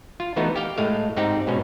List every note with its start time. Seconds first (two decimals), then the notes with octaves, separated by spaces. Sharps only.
0.20 F4
0.36 E3 A3 B3 D#4 F#4
0.56 G4 F5 G5
0.78 A2 G#3 A3 F5
1.16 G#2 C4 D#4 G4 F#5
1.47 G#2 B2 C#4